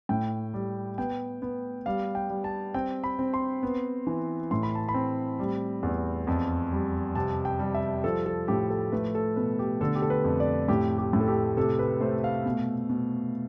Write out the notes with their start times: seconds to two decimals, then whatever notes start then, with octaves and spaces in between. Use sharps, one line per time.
0.09 A2 G5
0.54 G3
0.98 B3 G5
1.42 B3
1.86 G3 F5
2.15 G5
2.30 G3
2.44 A5
2.74 C4 G5
3.04 B5
3.19 C4
3.34 C6
3.63 B3
4.07 E3
4.51 A2 C6
4.63 B5
4.75 A5
4.89 B5
4.94 C4
5.39 G3
5.83 E2
6.27 F2
6.72 G3
7.15 C3 A5
7.45 G5
7.59 G3
7.74 E5
8.04 F3 A4
8.26 A4
8.48 A2 G4
8.70 A4
8.92 A3 B4
9.15 A4
9.36 B2 B4
9.59 G4
9.81 D3 A4
9.95 G4
10.02 A4
10.10 B4
10.24 F2
10.40 D5
10.68 A2 G4
10.98 G4
11.13 A2
11.21 A4
11.28 G4
11.57 C3 A4
11.79 B4
12.01 A3 C5
12.24 F5
12.45 B2
12.90 B2